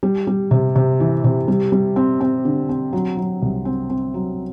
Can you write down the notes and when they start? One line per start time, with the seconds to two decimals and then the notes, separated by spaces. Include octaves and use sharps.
0.03 G3
0.27 G3
0.51 C3
0.75 C3
1.00 E3
1.24 C3
1.48 G3
1.72 G3
1.96 C4
2.21 C4
2.45 D3
2.69 C4
2.93 F#3
3.17 F#3
3.42 C2
3.65 C4
3.90 C4
4.14 F#3